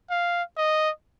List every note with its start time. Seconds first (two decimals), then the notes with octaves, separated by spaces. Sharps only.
0.10 F5
0.58 D#5